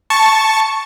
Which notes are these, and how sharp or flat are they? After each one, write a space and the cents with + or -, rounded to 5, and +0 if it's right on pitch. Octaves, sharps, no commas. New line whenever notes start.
A5 +0 C#6 +0